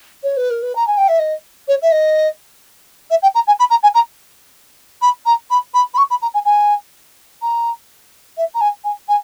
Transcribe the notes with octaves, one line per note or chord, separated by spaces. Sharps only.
C#5
B4
A#4
B4
A#5
G#5
G5
E5
D#5
C#5
E5
D#5
E5
G5
A#5
G#5
B5
A#5
G#5
A#5
B5
A#5
B5
B5
B5
C#6
B5
A#5
G#5
G#5
A#5
E5
A#5
G#5
G#5
G#5